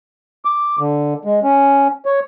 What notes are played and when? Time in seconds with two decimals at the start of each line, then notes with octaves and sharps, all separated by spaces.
0.45 D6
0.79 D3
1.25 G#3
1.43 C#4
2.06 C#5